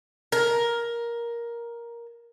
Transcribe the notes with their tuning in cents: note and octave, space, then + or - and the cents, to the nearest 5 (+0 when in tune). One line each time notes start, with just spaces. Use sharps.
A#4 +10